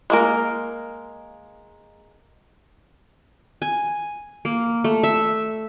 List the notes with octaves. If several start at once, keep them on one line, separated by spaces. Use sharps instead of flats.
G#3 A#3 A#4
G#5
A#3
A3
E5